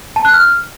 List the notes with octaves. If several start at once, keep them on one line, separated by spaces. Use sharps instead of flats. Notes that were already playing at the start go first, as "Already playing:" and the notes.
A5
F#6
F6